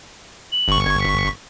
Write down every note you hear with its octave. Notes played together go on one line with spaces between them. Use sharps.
F#7
G1 C#6
G#6
B6